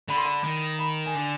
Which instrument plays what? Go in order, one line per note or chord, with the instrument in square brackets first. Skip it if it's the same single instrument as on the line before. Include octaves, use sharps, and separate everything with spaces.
[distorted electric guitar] D3 [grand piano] B5
[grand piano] C6
B5
[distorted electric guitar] D#3
[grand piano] B5
G#5
[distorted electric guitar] D3